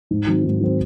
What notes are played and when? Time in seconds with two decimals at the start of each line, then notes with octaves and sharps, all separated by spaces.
0.11 G#2
0.27 D#3 F#3 C4
0.45 G#2
0.60 D#3 F#3 C4